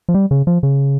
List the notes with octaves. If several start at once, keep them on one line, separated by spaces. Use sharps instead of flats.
F3
G3
C#3
F3
C#3